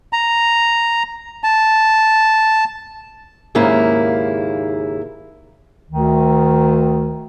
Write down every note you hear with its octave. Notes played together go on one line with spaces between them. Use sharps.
A#5
A5
D#2 G#2 C#3 A#3 E4
D2 D#3